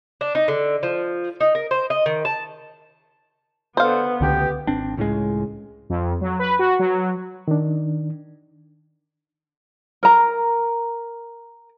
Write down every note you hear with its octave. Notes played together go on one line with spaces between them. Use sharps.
D4
D#4
D3
F3
D#4
A#4
C5
D#5
D#3
A5
D3 B3 C5 F5
C#2 D3 G4
G#1 C4 D4
C#2 A2 C#3 G#3
F2
F#3
B4
F#4
F#3
D#3 D4
A#4 A#5